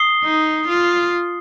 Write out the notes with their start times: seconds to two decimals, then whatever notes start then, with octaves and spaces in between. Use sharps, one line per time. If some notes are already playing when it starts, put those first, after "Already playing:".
Already playing: D#6 C7 G7
0.24 D#4
0.68 F4